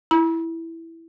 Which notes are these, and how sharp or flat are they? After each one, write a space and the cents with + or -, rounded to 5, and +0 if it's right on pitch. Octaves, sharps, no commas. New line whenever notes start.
E4 +0 B5 -45